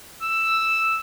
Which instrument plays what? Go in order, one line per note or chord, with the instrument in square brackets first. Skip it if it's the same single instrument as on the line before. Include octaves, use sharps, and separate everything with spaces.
[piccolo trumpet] E6